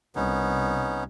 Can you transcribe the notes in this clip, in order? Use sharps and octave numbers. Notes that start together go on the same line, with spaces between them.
C2 B3 C#4 D#4